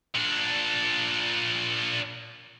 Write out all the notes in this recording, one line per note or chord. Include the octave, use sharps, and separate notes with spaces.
A#2 D4